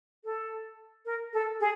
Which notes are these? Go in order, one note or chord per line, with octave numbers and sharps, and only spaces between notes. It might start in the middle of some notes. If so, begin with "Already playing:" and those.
A4
A#4
A4
G#4